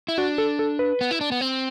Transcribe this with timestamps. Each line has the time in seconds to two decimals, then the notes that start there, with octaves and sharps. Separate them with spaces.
0.08 E4
0.18 D4 F#4
0.38 A4
0.59 A4
0.79 B4
1.01 B3
1.11 E4
1.21 D4
1.32 B3
1.41 C4